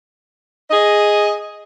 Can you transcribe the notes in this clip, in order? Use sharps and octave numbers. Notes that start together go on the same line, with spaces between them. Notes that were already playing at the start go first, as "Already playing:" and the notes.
G#4 D#5